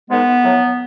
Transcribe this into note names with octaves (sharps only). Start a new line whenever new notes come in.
G#2 D#3 G#3 B3
A2 F#3